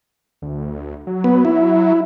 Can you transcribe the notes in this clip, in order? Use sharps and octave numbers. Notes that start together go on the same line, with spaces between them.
D2
F#3
B3
E4